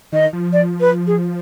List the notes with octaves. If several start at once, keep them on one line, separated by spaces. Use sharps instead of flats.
D#3 D#5
F3
D5
B4
G#4